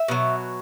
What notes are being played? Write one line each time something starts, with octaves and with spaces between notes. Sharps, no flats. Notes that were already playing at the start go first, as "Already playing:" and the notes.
Already playing: E5
B2 F#3